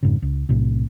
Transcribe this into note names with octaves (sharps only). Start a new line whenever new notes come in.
F2 G#2 C#3
C#2
B1 A2 C3